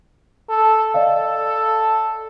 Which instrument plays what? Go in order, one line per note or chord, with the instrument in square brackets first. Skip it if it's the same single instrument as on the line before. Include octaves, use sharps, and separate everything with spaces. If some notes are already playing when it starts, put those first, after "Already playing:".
[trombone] A4
[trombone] A4 [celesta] D5 D#5 F5